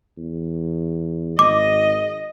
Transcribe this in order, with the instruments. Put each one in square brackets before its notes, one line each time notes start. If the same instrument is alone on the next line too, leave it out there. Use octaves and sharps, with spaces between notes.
[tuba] E2
[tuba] G#1 [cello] D#5 [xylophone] D6